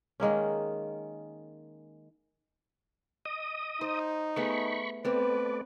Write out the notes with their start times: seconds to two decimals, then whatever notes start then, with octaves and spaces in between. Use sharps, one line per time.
0.20 D#3 G#3 A#3 C#4
3.25 D#5 D#6
3.81 D#4 C5
4.36 A3 B3 G#4 B5 C#6
5.05 A3 B3 C4 B4 D5